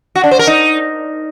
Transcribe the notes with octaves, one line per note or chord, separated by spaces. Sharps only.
F#4
D4
C5
A#4
D#4